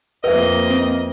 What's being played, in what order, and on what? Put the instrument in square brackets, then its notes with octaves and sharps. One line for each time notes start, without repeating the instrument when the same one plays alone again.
[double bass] F2 A#3 [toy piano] B4 E5 [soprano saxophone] D#5
[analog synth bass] C4